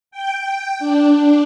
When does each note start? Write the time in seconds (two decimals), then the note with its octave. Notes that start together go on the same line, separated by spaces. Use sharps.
0.11 G5
0.79 D4